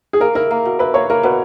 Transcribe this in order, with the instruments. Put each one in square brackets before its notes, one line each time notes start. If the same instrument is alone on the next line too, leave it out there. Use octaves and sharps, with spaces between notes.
[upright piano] G#4
[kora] A#3 [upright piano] A#4
[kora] E4 [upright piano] A#4
[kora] A#3
B2
[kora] E4 [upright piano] B4
[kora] A#3 [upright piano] C#5
[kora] A#3 [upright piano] A#4
[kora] B2 [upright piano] B4